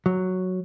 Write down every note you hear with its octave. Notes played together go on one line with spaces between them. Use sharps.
F#3